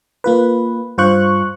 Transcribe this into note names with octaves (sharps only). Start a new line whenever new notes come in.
A#3 F4 B4
G2 F4 C5 C#6 F#6